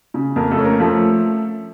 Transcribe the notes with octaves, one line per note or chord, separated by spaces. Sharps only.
C#3
F2 A#3 A#4
A3 A4
C#4
A#3 A#4
F3 A3 A4